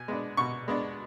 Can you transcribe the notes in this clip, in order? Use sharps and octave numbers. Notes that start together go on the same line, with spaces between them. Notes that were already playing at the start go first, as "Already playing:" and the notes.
Already playing: B2 G#5
G#3 B3 D4
B2 C#6
G#3 B3 D4